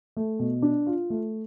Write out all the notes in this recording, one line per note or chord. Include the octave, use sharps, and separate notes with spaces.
A3
B2
D4
F4
A3